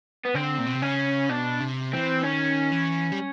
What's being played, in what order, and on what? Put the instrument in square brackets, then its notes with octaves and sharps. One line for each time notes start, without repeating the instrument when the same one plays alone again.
[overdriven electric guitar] B3
[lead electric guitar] D3 [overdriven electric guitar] C4
[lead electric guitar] A#2
B2
C3
[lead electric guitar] C#3 [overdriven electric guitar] C#4
[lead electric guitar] B2 [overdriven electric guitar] D4
[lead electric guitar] C3
[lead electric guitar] E3 [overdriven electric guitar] C4
[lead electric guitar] D#3 [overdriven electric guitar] C#4
[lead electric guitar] E3
G3